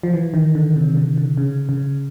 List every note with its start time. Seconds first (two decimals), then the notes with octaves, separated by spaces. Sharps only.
0.03 F3
0.14 E3
0.34 D#3
0.55 D3
0.76 C3
0.97 D3
1.18 D3
1.37 C#3
1.69 C#3